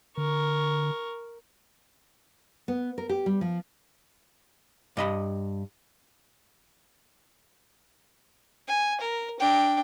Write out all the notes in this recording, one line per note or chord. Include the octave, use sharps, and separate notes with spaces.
D3 A#4 C#6
B3
A#4
G4
G3
F3
G2 D#5 B5
G#5
A#4
D4 G5